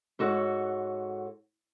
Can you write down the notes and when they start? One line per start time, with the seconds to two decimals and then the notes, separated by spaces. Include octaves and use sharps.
0.19 G#2 F#4 A4 C#5 F#5